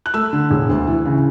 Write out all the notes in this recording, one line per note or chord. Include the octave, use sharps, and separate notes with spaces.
F#6
A3 E6
D3
E1
D2
E3
C#3